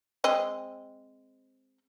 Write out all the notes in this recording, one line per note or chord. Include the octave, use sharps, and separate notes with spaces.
G#3 C4 D#5